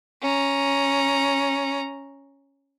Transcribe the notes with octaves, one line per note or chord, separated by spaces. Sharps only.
C#4 A#5